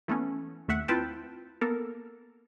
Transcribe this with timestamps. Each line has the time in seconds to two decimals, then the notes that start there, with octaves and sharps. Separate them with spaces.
0.08 E3 A3 B3 C#4
0.68 D#2 A3 E5 F#5
0.88 C4 E4 F4 B4 G5 A5
1.61 A#3 B3 A4 A#4